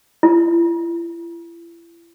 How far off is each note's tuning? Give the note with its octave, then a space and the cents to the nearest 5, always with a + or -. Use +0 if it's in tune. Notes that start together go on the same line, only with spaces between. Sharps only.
E4 +40